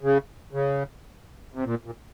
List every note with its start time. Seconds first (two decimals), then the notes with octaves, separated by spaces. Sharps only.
0.03 C#3
0.53 C#3
1.54 C3
1.64 A#2
1.85 A#2